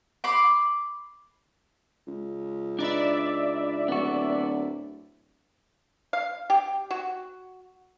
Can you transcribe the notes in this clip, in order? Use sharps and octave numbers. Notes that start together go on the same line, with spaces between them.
B5 C6 D6
C#2
D4 D#4 B4 D5 E5
D1 B3 F#4
F5
G4
F#4